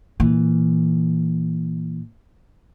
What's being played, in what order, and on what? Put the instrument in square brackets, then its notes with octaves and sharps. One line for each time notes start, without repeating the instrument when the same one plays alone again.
[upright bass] A#2 E3